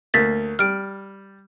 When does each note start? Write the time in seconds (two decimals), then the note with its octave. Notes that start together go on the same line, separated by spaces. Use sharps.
0.14 D2 A#3 A6 B6
0.59 G3 F6 D7